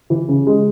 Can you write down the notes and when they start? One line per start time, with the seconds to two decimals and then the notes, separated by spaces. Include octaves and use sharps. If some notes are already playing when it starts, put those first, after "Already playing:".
0.10 E3
0.28 C#3
0.47 G#3